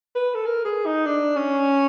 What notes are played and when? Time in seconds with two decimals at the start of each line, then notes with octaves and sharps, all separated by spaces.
0.15 B4
0.34 A4
0.46 A#4
0.65 G#4
0.86 D#4
1.06 D4
1.36 C#4